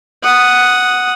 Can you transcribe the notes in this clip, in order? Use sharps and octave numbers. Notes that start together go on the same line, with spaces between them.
F#5 D#6